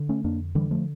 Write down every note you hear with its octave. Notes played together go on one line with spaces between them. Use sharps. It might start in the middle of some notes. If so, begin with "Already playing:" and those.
Already playing: D3
A3 C#4
F2 A#3 D4
D3 E3 G3
F3 A3